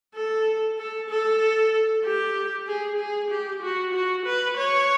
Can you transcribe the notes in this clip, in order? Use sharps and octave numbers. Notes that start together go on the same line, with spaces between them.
A4
A4
A4
G4
G#4
G#4
G4
F#4
F#4
B4
C#5